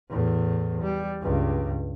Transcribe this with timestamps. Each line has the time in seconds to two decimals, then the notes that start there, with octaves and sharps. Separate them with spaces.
0.10 E2 A2
0.82 G3
1.21 C#2 G2